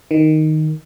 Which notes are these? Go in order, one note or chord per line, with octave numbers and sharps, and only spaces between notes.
D#3